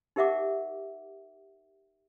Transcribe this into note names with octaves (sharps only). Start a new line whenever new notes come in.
D#4 G4 A#4 E5 F#5 D6